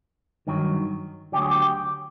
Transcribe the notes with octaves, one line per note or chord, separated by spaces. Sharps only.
G2 D#3 F#3
D2 D3 F#3 G4
G#4
G4